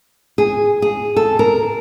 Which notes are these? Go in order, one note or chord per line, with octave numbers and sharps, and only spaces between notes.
G#4
G#4
A4
A#4